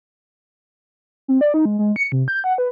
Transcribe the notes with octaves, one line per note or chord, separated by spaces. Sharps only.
C4
D5
D#4
G#3
G#3
C#7
C3
G6
F#5
B4